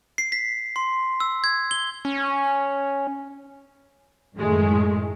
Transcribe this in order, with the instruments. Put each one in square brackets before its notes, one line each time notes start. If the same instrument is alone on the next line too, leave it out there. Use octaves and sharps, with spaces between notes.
[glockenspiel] C7
B6
C6
E6
G#6
G7
[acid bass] C#4
[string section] F#2 A2 D#3 G#3 A3